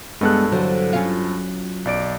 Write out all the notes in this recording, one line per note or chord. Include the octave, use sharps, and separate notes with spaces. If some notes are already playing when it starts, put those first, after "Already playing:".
G2 G#3 B3 G#4 A4 F#6
E2 D3 F#3 C5
C#4 F4
B1 D5 D7